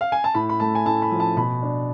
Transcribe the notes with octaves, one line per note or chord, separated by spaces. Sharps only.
F5
G#5
A5
A2 B5
B5
A3 A5
G#5
A2 A5
B5
F3
A5
B2 B5
D4